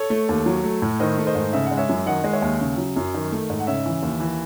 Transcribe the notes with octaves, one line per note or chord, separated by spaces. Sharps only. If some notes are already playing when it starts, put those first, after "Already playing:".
Already playing: A4 C#5
A3
D#2
F#3
A3
A2
D#3 C5 D#5
A3
C5 D#5
G#2
C#3 E5
F#5
G#3
C#5 E5
F#2
D#3 D#5 F#5
G#3
C#5 E5
D#2
C#3
F#3
F#2
D#3
A3
G#2
F#5
C#3 C#5 E5
E3
D#2
E3